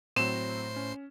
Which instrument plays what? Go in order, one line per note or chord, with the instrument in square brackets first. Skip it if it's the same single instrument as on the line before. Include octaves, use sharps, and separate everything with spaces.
[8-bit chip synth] A2 C5 C7 [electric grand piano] F#3 C4 [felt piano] E7
[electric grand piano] C#4